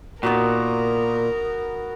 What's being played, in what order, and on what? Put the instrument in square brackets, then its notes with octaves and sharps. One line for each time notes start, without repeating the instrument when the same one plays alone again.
[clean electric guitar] A#2 [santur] B3 D#4 F#4 [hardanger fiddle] A#4